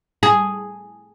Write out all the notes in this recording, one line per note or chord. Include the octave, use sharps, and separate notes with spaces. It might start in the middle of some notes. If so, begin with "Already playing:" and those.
G#4